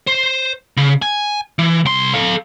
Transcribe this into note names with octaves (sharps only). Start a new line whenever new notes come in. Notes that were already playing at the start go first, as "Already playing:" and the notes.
C5
C#3
G#5
E3
C2 C6
A4 F5